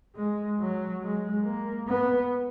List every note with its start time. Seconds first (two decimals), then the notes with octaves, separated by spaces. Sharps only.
0.16 G#3
0.60 F#3
1.02 G#3
1.45 A#3
1.88 B3